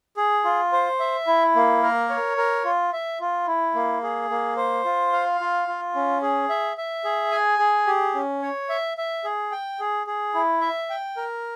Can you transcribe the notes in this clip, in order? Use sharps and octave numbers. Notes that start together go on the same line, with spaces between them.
G#4
F4
C5
E5
E4
A#3
A#4
C#5
A#4
F4
E5
F4
E4
A#3
G#4
A#3
C5
F4
F5
F4
F4
C#4
G#4
E5
E5
G#4
G#5
G#4
G4
C#4
C#5
E5
E5
G#4
G5
G#4
G#4
E4
E5
G5
A#4